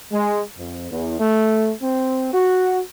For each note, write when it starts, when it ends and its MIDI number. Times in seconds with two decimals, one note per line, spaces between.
0.12 0.42 56
0.58 0.89 41
0.91 1.16 40
1.20 1.72 57
1.82 2.32 60
2.33 2.80 66